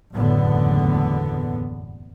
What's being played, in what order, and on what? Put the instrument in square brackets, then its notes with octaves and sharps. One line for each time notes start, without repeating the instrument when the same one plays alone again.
[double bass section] F#1 E2 A2 D3 B3